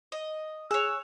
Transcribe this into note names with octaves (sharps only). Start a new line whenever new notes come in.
D#5
G#4 C#5 E6 F#6